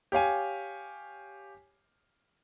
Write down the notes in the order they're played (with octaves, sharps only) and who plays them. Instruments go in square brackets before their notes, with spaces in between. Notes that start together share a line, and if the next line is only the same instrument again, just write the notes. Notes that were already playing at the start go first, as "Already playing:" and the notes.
[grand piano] G4 C#5 F5 G#5